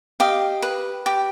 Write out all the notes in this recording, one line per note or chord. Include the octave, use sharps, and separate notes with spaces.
G4 D#5 F5
B4
G4